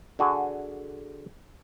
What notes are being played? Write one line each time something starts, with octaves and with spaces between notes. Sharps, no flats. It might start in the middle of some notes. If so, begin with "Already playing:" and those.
D3 F#4 G#4